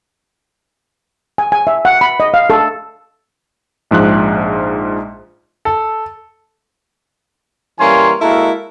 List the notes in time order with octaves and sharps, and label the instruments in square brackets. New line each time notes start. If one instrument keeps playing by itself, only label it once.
[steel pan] G#5
G#5
E5
F#5
B5
D#5
F5
A4
[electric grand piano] A#1 G#2 F3 F#6
[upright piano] A4
[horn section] E3 G3 A#3 C#4 G#5 C6
G#3 A#3 E4 F#4 A4 A#4